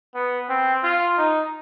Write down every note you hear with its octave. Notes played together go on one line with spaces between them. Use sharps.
B3
C4
F4
D#4